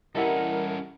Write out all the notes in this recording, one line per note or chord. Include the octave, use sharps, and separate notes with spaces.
G3 C#4 E4 A4 A#4 D#5 E5 F#5